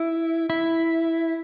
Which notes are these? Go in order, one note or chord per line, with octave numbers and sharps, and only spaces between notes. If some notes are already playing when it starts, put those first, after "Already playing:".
Already playing: E4
E4